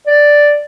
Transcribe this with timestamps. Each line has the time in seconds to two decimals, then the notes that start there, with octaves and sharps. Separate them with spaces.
0.07 D5